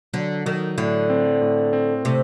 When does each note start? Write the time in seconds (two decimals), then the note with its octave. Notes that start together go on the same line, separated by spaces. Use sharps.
0.13 D3 F#3
0.46 D#3 F#3
0.78 A2 D3
1.10 C4
1.41 A2
1.73 C4
2.05 C3 A3